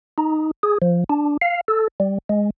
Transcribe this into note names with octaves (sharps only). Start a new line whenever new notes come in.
D#4
G#4
F3
D4
F5
A4
G3
G#3